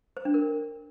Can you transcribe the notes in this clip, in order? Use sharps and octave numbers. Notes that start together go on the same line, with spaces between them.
C5
D4
A#4